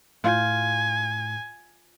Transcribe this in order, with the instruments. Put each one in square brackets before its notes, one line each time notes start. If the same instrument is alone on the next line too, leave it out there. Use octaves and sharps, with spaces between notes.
[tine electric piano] A2 G6 [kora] F4 [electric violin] G#5